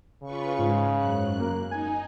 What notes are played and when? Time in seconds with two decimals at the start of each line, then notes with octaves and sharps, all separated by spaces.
0.23 C#3 F4 B4 C#6
0.59 G#2 G#3
0.96 F#2 F#6
1.40 A#3
1.71 D#4 G#5